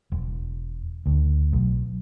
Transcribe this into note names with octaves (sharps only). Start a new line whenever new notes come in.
E1
D2
B1